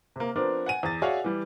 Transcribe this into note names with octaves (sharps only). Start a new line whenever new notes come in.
C3 A#3
F3 B3 C4 D4 A#4
F#5 G#5 D#7
E2 A6
F#4 G#4 C#5 D5 E5 F5
E3 G3